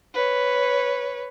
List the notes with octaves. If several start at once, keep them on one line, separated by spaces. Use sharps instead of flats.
B4 C#5